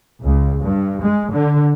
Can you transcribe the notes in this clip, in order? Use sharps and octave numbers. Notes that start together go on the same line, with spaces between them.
C#2
G2
G#3
D3